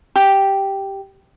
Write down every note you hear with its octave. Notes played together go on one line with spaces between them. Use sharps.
G4